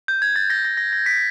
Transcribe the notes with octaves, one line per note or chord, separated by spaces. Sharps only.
G6
G#6
A6
A#6
A#6
A#6
A#6
B6